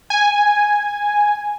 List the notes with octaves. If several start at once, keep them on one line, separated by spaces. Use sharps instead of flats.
G#5